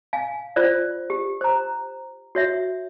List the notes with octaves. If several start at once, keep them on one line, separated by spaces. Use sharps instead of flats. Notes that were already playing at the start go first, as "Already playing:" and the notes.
F5 G#5
F4 C5 D5
G4
C5 A#5
F#4 C#5 E5